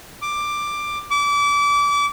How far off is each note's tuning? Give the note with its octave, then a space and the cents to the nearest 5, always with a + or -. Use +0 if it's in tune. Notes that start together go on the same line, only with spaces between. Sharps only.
D6 +10
D6 -30